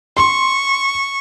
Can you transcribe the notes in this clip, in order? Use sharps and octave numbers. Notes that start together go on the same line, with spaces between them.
C6 C#6